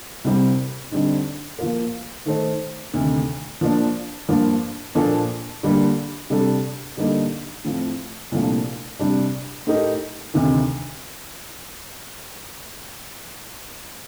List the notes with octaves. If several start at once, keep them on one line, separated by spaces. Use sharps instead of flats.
C2 C3 G3 C4
D3 G3 C4 D#4
F3 A#3 F4 A#4
D#3 A3 D#4 A4 C5
D2 C3 D#3 A3
F3 A#3 D4
G2 F3 A#3 F4
A#2 F3 A#3 D4 A4
D3 G3 A#3
C3 G3 D4 A4
D3 G3 A#3 D#4 A4
A2 F3 C4
C2 A#2 F3 A3 D4
C3 G3 D4
A2 A3 D#4 G4 A#4
D2 C3 D#3